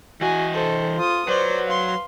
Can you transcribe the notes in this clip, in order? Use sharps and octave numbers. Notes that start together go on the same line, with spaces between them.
E3 F#4 D#5 G#5
A4 C5
F4 D#6
F#3 B4 C5 D5
F5 C6